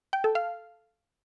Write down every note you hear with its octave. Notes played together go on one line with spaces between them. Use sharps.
G5
A4
F5